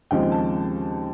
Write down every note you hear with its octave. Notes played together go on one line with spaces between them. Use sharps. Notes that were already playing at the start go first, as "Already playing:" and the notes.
D#2 C#3 F3 G#3 C4 G5
A5